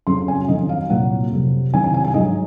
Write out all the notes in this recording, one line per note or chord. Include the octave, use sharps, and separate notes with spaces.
F2 C#3 F#3 C6
G#5
F2 D#3 F#3 D#5
F5
C2 A#2 F#3 F#5
F2 C3 F#3
C2 C3 D#3 F#3 G#5
G#5
G#5
G#5
G#2 F#3 D#5